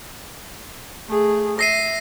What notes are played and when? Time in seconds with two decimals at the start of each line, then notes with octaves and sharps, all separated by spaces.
1.07 A3 G#4
1.59 E5 A#6 C7 D#7